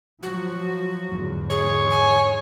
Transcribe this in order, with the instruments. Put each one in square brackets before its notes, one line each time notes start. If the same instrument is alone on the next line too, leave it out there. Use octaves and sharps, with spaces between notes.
[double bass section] F3 F#3 [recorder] F#4
[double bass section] E2 G#2 D3
[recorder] G#4 [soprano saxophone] C#5
[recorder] G#5